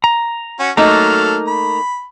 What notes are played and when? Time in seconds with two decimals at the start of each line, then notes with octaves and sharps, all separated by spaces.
0.04 A#5
0.60 C#4 F#4
0.77 F#3 A3 A#3 D#4 A4 A#5 F6
1.47 B5